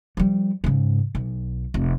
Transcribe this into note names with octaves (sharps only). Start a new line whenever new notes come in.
F3 G3
G#2 C#3
B1
F1